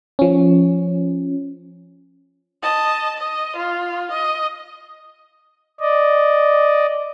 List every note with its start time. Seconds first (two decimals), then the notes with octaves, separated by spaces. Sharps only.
0.19 F3 C#4
2.62 D#5 A5
3.18 D#5
3.56 F4
4.12 D#5
5.80 D5 D#5